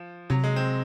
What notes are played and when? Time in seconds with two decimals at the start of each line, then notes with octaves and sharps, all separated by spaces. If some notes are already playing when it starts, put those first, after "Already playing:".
Already playing: F3
0.30 C3 F#3
0.44 G#3
0.56 C4